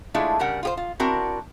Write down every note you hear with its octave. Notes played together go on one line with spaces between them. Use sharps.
G#3 A3 D4 E4 F4
C#3 G3 A#4 F#5
F4 G4 C5
F4
C4 D4 E4 F#4 A#4